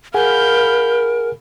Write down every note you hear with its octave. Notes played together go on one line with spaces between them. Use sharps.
G#4 A#4 F5 F#5 G#5 B5 G6